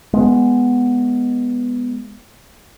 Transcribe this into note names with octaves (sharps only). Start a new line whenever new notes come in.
G#3 B3